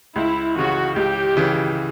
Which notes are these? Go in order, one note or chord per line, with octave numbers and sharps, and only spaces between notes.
C#2 E4
C#3 E3 F#4
C#2 G4
C#3 E3